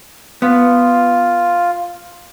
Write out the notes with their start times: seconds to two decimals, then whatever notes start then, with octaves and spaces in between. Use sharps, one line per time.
0.42 B3 F4